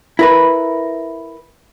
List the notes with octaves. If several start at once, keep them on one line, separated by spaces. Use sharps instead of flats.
E4 A#4 B4